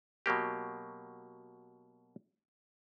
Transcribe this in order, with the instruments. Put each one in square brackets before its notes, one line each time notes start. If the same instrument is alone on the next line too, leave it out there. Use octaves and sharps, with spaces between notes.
[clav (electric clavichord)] B2 F#3 A#3 G4